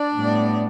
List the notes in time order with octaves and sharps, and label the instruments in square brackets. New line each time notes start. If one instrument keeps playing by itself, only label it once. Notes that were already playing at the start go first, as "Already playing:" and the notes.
Already playing: [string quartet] D4 D5
A2 G3 B3